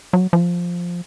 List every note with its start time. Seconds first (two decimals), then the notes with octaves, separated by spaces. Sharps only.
0.13 F#3
0.33 F3